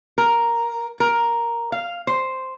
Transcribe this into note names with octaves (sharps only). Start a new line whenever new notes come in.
A#4
A#4
F5
C5